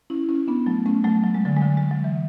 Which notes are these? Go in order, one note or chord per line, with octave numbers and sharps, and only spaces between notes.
C#4 E4
C#4 E4
B3 D4
F#3 A3
A3 C#4
F#3 A3
F#3
G#3
D3 F#3
G#3
D3 F#3
G#3
F#3
E3